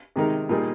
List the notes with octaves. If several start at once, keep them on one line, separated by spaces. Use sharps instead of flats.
C3 D#3 G#3 D#4 A#4
A#2 G3 A#3 D#4 G#4